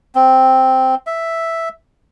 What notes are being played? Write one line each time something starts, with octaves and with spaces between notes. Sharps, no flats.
C4
E5